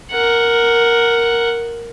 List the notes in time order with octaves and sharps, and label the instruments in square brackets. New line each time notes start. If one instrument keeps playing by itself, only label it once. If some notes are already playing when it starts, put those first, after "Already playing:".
[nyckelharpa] A#4 F#5